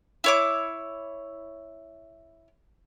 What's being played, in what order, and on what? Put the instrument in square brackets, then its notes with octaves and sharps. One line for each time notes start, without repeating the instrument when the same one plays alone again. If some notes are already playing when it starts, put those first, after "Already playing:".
[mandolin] E4 C#5 D6